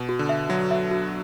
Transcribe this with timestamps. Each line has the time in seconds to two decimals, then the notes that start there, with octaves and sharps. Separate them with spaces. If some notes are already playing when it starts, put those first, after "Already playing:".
Already playing: B2
0.09 F#4
0.19 D3
0.29 E5
0.49 F#3 F#4
0.71 E5
0.91 F#4